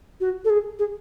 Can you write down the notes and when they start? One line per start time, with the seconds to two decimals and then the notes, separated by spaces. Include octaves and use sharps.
0.20 F#4
0.45 A4
0.50 G#4
0.79 G#4